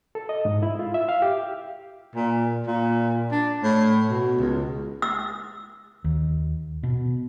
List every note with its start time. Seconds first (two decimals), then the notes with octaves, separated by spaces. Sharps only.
0.15 A4
0.29 D#5
0.45 G#2
0.63 E4
0.79 F4
0.94 E5
1.09 F5
1.22 G4
2.15 A#2
2.67 A#2
3.32 D4
3.63 A2
4.09 B2
4.39 C#2
5.02 E6
6.04 D#2
6.83 B2